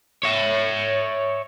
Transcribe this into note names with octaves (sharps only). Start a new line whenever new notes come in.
C#5 E5